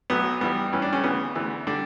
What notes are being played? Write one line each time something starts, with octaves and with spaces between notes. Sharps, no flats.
B1 A2 F#3 B3
G2 E3 G3 B3
G2 E3 G3 C#4
D4
C#3 C#4
D2 C#3 E3 B3
D2 C#3 E3
D3 G3 D4